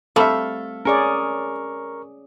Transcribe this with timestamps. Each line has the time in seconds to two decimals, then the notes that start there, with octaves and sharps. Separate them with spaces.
0.16 G3 A3 C4 A4 E5 F5
0.85 C#4 G#4 A#4 D5 C#6